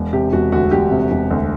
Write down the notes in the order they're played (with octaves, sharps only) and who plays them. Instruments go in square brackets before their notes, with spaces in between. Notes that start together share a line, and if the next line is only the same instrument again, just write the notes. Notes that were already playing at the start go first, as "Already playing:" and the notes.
Already playing: [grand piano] E1
[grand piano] C3 [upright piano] G4
[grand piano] E1 [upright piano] F#4
[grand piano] D2 [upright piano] F#4
[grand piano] E1 [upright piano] G4
[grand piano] C3
E1
D2